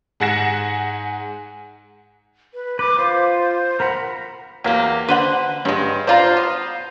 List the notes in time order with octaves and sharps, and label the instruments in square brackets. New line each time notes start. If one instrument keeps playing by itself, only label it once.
[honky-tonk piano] G#2 G#4 F#5 G#5 A#6 E7
[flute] B4
[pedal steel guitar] B4 [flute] D6
[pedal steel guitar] F4 [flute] C5
[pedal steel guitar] A#4 A#5 B5 [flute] F#5
[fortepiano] E2 A#3 [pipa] F#3 G4
[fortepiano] D3 [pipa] B4 C5 F#5
[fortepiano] G2 [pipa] C#3 G#3
[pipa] D4 F4 [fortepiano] C5 F5 A#5
[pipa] B3